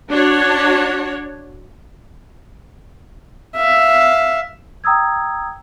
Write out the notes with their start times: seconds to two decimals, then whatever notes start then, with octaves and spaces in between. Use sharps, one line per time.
0.10 D4 F#4 C#5
3.56 E5 F5
4.84 G5 A#5 D#6 E6 G#6